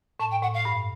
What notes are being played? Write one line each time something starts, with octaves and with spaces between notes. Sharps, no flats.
A2 A5
G5
A2 F#5
F5
G2